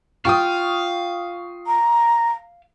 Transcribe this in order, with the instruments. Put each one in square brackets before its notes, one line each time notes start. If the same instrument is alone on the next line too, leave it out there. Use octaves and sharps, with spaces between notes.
[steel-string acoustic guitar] F4 G5 [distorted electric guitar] F5 [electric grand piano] C#6 D#6
[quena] A#5